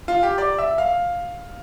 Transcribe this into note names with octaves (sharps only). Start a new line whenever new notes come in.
F4
G4
D5
E5
F5